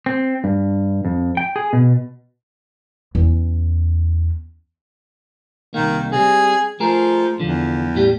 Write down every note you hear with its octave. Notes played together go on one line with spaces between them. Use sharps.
C4
G2
F2
G5
G#4
B2
E2 C#4
C2 D#3 A#3
G3 C4 G#4
F3 A3 G#4 A#4
E2 D3 F3
A2 G3 G4